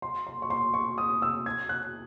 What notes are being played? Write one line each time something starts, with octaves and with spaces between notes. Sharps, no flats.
C6
C6
C#6
C6
C#6
D#6
E6
G#6
F#6